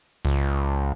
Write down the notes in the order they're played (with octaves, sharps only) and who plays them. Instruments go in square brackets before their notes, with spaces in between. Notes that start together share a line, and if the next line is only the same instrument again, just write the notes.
[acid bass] C#2